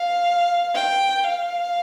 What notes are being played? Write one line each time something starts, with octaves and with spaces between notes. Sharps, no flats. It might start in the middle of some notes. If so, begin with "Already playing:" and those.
Already playing: F5
G5
F5